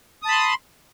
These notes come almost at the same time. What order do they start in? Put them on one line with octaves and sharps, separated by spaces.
D#6 A5 B5 C6